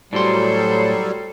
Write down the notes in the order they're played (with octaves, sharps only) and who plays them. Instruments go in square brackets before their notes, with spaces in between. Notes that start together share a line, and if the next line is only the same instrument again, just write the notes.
[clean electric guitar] A2 C6 [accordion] F#3 G3 [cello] A4 C5